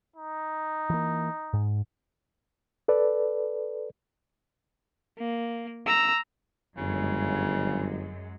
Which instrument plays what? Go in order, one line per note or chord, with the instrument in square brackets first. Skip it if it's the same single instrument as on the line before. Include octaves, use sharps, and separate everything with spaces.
[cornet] D#4
[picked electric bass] E3 A#3
G#2
[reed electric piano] A4 B4 D5
[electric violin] A#3
A#5 E6
[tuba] G1 [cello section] F#2 F#3 G#3 [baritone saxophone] C#3